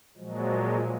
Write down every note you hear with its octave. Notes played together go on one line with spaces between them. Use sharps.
A#2 F3 F#3 G#3